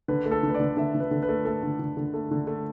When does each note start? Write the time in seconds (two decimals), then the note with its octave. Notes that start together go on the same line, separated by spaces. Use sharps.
0.08 D3 B4
0.25 A3
0.31 A4
0.43 D3
0.49 B4
0.54 D5
0.60 D3
0.77 D3 E5
0.95 D3
1.00 B4
1.11 D3
1.23 B4
1.29 A3
1.45 A3 A4
1.63 D3
1.80 D3
1.97 D3
2.14 A3
2.31 D3
2.47 A3